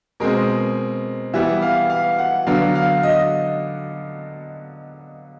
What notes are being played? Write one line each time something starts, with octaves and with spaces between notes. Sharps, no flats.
B2 G#3 C4 A#4
E3 G3 B3 E5
F5
F5
F#5
D3 F#3 B3 D4 F5
F5
D#5